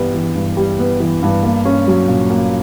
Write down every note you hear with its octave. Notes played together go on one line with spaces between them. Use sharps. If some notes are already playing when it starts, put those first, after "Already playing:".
Already playing: G2 E3 G3 B3
E3
G2
G3
B3
E3
G2
A#3
C#4
F#3
A#2
A#3